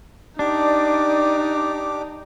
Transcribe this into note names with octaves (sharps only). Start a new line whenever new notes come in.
D4 D#4 G4 D5 D6